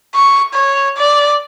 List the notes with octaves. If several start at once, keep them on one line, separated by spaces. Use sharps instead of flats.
C#6
C#5
D5